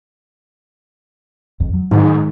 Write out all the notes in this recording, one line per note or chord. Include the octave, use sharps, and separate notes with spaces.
F2
F#3
G#2 D#3